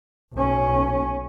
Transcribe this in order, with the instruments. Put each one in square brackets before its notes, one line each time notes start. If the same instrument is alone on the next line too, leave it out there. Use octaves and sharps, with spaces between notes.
[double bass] B1 C#4